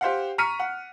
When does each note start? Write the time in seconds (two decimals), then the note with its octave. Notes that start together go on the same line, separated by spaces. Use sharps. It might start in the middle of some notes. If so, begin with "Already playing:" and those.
0.01 G4 C5 F5 F#5
0.38 A#5 C#6 F6 B6 C#7 D#7
0.60 F#5